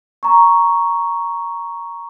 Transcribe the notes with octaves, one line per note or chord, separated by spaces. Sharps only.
A#5 C#6